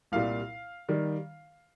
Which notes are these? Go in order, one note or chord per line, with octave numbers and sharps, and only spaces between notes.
C2 A#2 G3 F5
D#3 G3